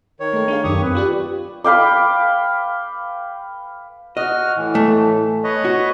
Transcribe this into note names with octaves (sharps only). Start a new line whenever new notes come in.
D#3 C#5
A3 A4
D4 G#4 F5
F#2 D#3 G4 C#6 D#6
C4 B4
F4 G4 D5
B4 F5 G5 D6
F#4 D#5 F6
A2 E3
A3
B4 C#5 D#5
F#4